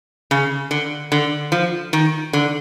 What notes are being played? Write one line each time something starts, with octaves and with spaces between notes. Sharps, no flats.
C#3
D3
D3
F3
D#3
D3